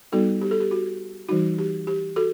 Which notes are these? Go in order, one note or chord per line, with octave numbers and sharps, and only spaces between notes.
G3 B3 D#4 F#4 A4
G4
A4
G4
F#4
E3 G3 D#4 F#4
G4
G4
F#4 A4